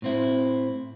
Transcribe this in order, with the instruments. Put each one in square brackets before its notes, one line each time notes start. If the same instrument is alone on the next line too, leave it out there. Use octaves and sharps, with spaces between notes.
[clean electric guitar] A2 C4 E4